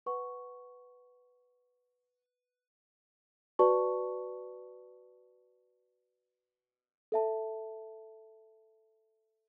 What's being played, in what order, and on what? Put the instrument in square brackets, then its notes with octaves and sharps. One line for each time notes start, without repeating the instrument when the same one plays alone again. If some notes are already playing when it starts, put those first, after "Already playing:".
[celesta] B4 F#5 C#6
F#4 B4 D5 A5 C#6
A4 E5 A5